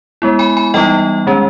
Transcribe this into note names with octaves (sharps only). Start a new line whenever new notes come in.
G#3 B3 E4
G#5 B5
G#5 B5
E3 G3 B3 D#4 D#5 G5
D#3 G#3 C#4